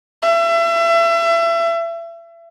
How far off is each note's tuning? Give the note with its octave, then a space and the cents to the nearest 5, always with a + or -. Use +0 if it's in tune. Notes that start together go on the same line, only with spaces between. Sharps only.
E5 +30